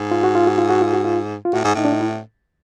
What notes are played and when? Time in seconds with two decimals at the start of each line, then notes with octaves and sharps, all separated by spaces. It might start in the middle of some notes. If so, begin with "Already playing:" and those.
Already playing: G#2
0.11 F4
0.24 F#4
0.35 F4
0.47 F#4
0.58 F4
0.70 F#4
0.82 F4
0.93 F#4
1.05 F4
1.45 F4
1.53 A2 F#4
1.64 G#2
1.75 A2 D#4
1.85 D4
1.93 D#4
2.00 E4